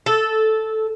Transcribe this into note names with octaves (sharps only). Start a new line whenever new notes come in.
A4